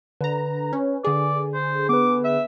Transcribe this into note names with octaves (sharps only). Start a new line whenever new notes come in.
D3 B4 A#5
C#4
D3 G#4 D5
C5
B3 B4 D6
E5